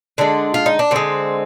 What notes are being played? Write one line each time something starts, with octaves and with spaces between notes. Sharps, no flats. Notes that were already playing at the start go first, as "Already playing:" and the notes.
D3 G#3 D4
F4
D#4
D4
D3 G#3 C4